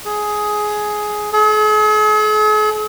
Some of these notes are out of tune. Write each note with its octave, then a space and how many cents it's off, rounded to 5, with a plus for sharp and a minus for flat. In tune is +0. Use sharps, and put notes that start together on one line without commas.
G#4 +10
G#4 +45